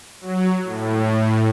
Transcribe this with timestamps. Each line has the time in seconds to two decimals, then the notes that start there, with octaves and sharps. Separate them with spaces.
0.21 F#3
0.65 A2